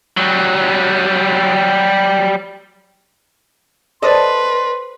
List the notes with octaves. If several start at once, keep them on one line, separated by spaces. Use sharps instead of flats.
F#3 G3
G#4 A4 B4 C5 D5 D#5 C6